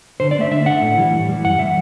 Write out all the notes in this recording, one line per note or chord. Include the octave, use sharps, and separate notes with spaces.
D3 C5
D5
A3 D4 E5
D3 E5
A3 D4 F#5
A2
E3 G3
A2
E3 G3
F#2 F#5
E3 G3 E5